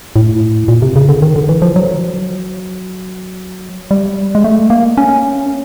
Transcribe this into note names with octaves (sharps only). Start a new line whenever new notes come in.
A2
A#2
C3
C#3
D3
D#3
D3
E3
F3
F#3
G3
G#3
A3
A#3
C#4